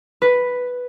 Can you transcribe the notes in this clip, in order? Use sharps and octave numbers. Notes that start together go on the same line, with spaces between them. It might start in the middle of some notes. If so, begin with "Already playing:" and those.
B4